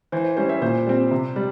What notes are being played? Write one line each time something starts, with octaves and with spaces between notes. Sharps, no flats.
E3 C5
C5
G3 C#4 C5
C5 E5
A#2 C5
G3 C4
C3
G3